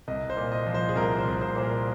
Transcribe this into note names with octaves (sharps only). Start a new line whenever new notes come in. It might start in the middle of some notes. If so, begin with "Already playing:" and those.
C2 D#5
C5
A#2
D#5
F3
C5
G#4
C2 A#4
C5
C2
C5
A#2 C5
A#4